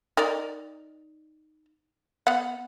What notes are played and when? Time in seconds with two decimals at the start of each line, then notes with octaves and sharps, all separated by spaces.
0.17 D#4 A#4 D5
2.27 B3 F#5